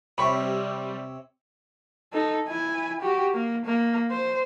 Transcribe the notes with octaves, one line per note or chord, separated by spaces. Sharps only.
C3 G3 C4 C#5 E5 B5 C#6
D#4 A4
E4 G#5
F#4 G4
A#3
A#3
C5